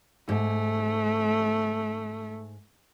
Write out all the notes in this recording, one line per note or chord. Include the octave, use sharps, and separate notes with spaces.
G#2 A3